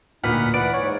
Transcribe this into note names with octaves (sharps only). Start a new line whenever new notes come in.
D2 A#2 D#4 B4 F#5 F6 B6
E3 B4 D5 F#5 D7
G#2 C#5